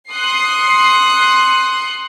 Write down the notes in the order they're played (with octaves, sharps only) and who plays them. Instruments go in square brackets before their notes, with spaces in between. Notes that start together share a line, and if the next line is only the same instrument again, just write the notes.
[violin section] C6 D#6 F#6 C7 C#7